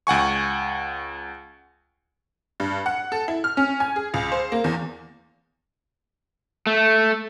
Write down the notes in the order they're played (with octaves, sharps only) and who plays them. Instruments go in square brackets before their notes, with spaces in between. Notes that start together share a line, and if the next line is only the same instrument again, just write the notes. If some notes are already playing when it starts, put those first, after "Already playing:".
[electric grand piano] C#2 F#5 G#5 C#6
[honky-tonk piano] G2
F#5
A4
E4
F6
C#4
G#5
G#4
C#2
C5
A#3
E2
[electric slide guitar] A3